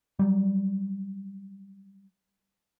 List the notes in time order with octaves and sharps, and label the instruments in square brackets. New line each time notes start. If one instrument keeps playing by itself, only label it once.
[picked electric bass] F#3 G3